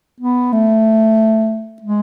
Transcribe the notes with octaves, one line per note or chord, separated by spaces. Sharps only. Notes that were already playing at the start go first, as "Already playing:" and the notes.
B3
A3
G#3